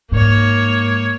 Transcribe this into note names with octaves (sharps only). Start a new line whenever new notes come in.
G#2 A#3 C#5